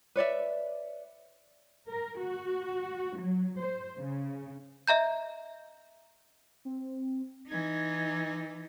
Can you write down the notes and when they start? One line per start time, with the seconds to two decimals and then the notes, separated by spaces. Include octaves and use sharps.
0.16 B4 C#5 D5 E5
1.90 A#4
2.20 F#4
3.18 F#3
3.62 C5
3.99 C#3
4.87 D#5 E5 A#5 G6
6.65 C4
7.48 E3 D#4 G#6